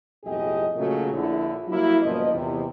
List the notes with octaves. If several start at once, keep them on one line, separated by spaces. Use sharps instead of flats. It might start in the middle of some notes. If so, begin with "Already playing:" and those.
B1 F2 A2 G4 G#4 D#5
A#2 C#3 F#3 A3 F#4
A#1 D3 E4
F#3 G3 A#3 E4
F#1 A#2 F3 B3 D#5
E2 C3